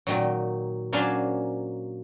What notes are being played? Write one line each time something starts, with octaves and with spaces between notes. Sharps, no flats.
A#2 D#3 F#3
F#3 A#3 C#4 D4 C5 G#5